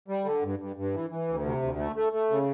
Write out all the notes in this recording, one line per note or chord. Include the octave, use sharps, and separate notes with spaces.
G3
D3
G2
G2
G2
E3
E3
D2
C3
D2
A3
A3
A3
C#3